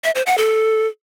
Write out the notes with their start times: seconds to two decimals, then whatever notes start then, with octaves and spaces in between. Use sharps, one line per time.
0.04 E5
0.15 C5
0.26 F#5
0.38 A4